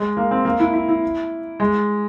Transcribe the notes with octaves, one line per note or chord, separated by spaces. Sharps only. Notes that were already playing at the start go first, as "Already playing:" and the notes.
Already playing: G#3
A#3
C4
A#3
E4
E4
E4
G#3